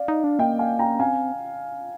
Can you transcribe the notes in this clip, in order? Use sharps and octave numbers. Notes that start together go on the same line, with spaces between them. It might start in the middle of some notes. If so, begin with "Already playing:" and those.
Already playing: D5 F5
D#4
D4
A#3 D#5 G5
F5 G#5
G5 A#5
C4 F5 G#5